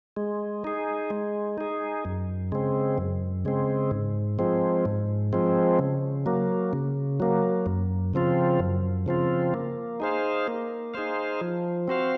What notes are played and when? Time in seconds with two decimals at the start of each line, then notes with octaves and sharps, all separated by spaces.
0.17 G#3
0.64 D#4 G#4
1.10 G#3
1.58 D#4 G#4
2.05 F#2
2.52 C#3 G#3 C4
2.98 F#2
3.45 C#3 G#3 C4
3.91 G#2
4.39 F3 G#3 C4
4.85 G#2
5.33 F3 G#3 C4
5.79 C#3
6.26 F#3 A#3
6.73 C#3
7.20 F#3 A#3
7.66 F#2
8.14 C#3 F3 C4 F4
8.59 F#2
9.06 C#3 F3 C4 F4
9.54 A#3
10.00 D#4 G#4 C5 F5
10.48 A#3
10.94 D#4 G#4 C5 F5
11.41 F3
11.88 C4 F#4 C5 F5